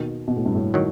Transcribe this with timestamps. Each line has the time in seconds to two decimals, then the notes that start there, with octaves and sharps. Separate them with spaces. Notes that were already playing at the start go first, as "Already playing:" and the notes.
Already playing: D#2 B2 D#3
0.28 B2
0.37 A2
0.46 G2
0.55 A2
0.74 D#3 F#3